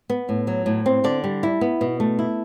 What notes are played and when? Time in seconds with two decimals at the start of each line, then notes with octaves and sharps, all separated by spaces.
0.10 B3
0.29 A2
0.47 F#3
0.66 A2
0.86 C4
1.04 D3 D5
1.24 G3
1.43 E4
1.61 B3
1.81 B2
2.00 A3
2.19 E4